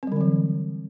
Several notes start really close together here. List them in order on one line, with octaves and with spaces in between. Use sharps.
C4 G3 D3 F#3 E3